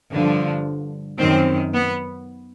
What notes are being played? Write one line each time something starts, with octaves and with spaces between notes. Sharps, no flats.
G2 D3 F3
F#2 D#3 C4
B3